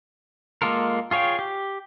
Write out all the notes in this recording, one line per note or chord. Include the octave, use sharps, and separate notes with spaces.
G#3 A#3 F4 A4 A#4
F4 G#4 C#5 F5 G5
G4